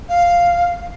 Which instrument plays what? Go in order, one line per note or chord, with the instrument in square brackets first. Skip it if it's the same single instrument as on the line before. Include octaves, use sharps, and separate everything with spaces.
[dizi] F5